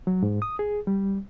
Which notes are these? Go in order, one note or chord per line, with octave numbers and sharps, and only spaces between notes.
F#3
G#2
D#6
G#4
G3